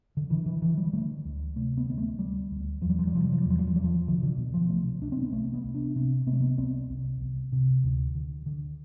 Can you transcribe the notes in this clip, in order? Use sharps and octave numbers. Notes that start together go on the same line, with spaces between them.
D3
D3 E3
E3
D3 E3
G3
D3 A3
D2
C3 A3
B3
D2 B3
A3
D2 G3
D2
E2 F3
G3
F3
G3
C3 F3
G3
F3
E2 G3
F3
G3
F3
E2 G3
F3
C2 D3
D3
B2
F3
C2 A3
C2 D4
C4
B3
C2 A3
B3
C2
D4
C3 C4
C3 B3
A3
B3
C2 C4
C2
C2
C3
D2
D3
D3